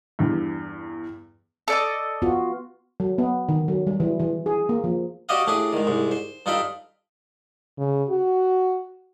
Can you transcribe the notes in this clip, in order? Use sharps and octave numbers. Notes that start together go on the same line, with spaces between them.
E2 G2
A4 D5 D#5
B3 F4 F#4
F#3
B3
D#3
F#3
G3
E3
E3
G#4
A#3
F3
F#4 G4 C5 D5 D#5 F5
A2 D4 G4 G#4
G#2 D#3
C2 G#2
C5
G2 D#4 F4 A4 G5 B5
C#3
F#4